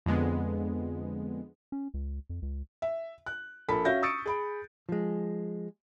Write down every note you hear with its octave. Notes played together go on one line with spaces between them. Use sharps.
F2 D3 G#3 B3
C#4
C#2
F2
C#2
E5
F#6
A#1 A4 A#4 B5 B6
C#4 F#4 E5 F5 G6 A#6
C#6 D#6 E6 A6 C#7 D7
G#4 B5 D7
F3 G#3